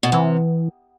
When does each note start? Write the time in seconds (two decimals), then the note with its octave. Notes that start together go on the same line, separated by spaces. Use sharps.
0.03 B2
0.12 C3 E3